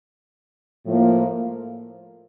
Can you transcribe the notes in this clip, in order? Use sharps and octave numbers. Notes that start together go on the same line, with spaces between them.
A2 F3 A#3